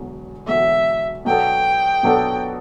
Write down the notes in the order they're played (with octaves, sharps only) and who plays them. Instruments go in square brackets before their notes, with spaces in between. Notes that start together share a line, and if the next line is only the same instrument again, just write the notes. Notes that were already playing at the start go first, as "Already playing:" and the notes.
Already playing: [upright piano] E1 E2 D3 F#3
[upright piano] E1 E2 D3 F#3 [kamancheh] E5
[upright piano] B2 F#3 B3 D4 A4 [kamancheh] G5
[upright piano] B2 F#3 B3 D4 A4